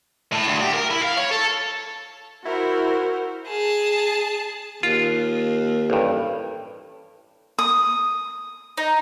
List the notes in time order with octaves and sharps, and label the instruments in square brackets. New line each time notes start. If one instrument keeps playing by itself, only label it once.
[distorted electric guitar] A2
D2
G4
A#4
E4
F5
C#5
A4
[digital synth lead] E4 [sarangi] F#4 [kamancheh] A#4 C5
[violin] G#4 A5
[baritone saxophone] D#2 [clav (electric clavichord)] F4
[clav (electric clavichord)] A1 G2
[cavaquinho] D#6
[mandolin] D#4